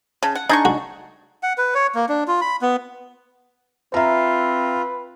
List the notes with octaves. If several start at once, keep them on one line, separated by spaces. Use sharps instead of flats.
C#3 A5
F#5
D4 D#4 G#4 D#5 C#6
F#4
F#5
B4
C#5
A#3
D4
F4
B5
B3
C4 F4 B4 E5 A#5